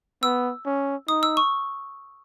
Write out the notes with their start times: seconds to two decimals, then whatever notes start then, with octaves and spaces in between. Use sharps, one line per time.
0.23 B3 E6
0.66 C#4
1.08 D#4 D#6
1.23 E6
1.37 C#6